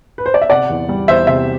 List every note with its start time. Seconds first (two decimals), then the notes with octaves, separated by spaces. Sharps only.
0.18 B4
0.26 C5
0.34 D5
0.41 E5
0.50 C3 D5 F#5
0.70 E2
0.89 G3
1.08 E2 C5 E5
1.27 C3 C5 E5